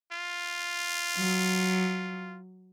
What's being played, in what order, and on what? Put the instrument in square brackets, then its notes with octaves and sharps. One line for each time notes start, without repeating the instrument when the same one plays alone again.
[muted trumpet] F4
[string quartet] F#3